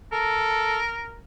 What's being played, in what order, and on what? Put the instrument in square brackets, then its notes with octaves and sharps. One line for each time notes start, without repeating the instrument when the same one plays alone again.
[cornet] A4 [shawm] A#4